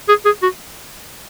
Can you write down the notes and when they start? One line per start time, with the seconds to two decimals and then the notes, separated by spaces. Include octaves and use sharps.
0.09 G#4
0.25 G#4
0.43 F#4